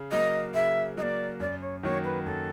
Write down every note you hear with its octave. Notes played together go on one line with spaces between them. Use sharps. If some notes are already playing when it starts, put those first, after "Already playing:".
Already playing: C#3
F#3 A#3 D#5
C#3 E5
F#3 A#3 D5 D#5
F#2 D5
C#5
D#3 F#3 A#3 C#5
B4
F#2 A4